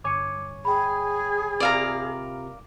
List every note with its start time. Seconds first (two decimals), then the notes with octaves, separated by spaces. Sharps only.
0.04 G1 C#5 G#5 D6 C#7
0.65 G#4 G5 B5
1.60 C3 F4 A#4 D5 F5 A#5